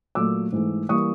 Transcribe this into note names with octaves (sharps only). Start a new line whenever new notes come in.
A#2 F#3 A3 D6 E6
G#2 E3 A3
E3 G3 A#3 C#6 D#6